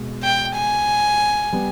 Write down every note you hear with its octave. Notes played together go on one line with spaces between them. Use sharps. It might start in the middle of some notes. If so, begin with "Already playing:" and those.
Already playing: B2 G#3
G5
G#5
G3 B3